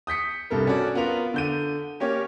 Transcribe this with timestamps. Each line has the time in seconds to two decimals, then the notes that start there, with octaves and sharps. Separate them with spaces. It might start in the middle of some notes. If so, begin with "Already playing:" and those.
0.07 D#6 G6 B6 C#7
0.50 C2 G2 A4 A#4
0.67 C#4 F#4 D5
0.95 B3 F4 A#4 F7
1.34 D3 G6 D#7
2.00 A#3 C#4 G4 C#5